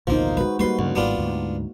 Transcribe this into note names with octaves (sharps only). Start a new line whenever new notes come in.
A1 D2 B2 F3 A#3 D#4 C5
G#3 F#4 B4
G3 A#3 F#4 B4 C6
D2 G2 C#3 F#3
G#1 G#2 G3 B3 D4 F4
D2 G#2